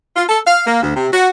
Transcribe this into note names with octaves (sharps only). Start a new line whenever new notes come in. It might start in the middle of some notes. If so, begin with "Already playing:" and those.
F4
A4
F5
A#3
D2
C3
F#4